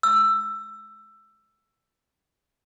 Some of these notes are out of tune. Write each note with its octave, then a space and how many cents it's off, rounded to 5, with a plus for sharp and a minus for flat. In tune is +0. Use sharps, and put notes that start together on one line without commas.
E6 +15